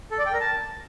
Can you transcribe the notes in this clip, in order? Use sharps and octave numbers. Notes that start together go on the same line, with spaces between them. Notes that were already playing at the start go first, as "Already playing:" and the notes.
A4
D5
G5
A#4
A5